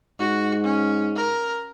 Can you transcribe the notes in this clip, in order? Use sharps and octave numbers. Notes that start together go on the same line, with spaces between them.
G#2 F#4
C#4
A#4